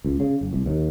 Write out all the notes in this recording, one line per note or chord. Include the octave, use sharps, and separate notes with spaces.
C#2
C#3
F#1
C2
D#2